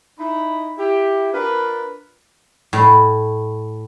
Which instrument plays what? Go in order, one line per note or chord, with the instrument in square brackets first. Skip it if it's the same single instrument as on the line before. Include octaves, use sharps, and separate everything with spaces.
[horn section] D#4 E4 B5
E4 G4
D4 F4 A#4 B4
[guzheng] A2